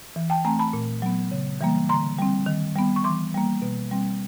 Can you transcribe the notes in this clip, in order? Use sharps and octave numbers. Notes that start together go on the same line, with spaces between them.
E3
G5 A5
A3 C4 G#5 A#5
A5 B5
A#2
F#3 B3
C#3
E3 G3 A#3
D3 A#5 C6
G3 C4
D#3
G3 B3
C#6
E3 C6 D6
G3 A#3
B2
G3 C4